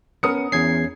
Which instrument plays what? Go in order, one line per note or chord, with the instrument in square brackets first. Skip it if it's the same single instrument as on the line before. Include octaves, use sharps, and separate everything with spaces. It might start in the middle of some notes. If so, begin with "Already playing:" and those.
[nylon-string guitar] B3 C#4 [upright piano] A#4 D#6 C#7
[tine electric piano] E2 G#6 C7 [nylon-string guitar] C#4